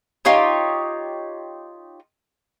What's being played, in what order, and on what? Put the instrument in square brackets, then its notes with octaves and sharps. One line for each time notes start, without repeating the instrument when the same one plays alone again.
[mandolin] D#4 F4 G4 C#5